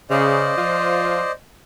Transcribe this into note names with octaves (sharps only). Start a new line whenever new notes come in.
C#3 C5 D5 D#5
F3 F4